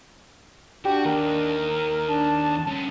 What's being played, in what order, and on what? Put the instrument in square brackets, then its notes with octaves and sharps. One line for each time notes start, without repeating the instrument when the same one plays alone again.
[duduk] D4 [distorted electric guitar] F#4 [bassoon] G4
[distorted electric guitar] D#2 [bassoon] A#4
[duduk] D4 [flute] A5
[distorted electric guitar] G2 C#4